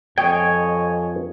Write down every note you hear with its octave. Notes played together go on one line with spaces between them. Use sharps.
F2 C#5 D#5 G5 G#5